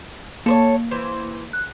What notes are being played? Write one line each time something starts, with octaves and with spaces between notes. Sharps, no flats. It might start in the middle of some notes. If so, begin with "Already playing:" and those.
A#3 A4 C5 C#5
E3 C5
F#6